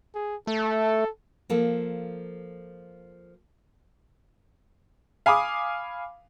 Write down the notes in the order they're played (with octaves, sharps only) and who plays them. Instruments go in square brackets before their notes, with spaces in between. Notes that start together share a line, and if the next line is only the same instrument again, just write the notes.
[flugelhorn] G#4
[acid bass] A3 [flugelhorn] A4
[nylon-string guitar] F3 A#3 A4
[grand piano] F5 G#5 B5 D6 D#6